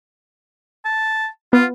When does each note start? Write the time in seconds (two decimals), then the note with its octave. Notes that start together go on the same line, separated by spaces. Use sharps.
0.85 A5
1.53 B3 F4